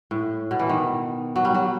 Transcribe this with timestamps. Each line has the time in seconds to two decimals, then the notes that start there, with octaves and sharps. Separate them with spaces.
0.11 A2
0.51 B2
0.59 E3
0.69 D#3
1.36 F#3
1.45 G3
1.55 F#3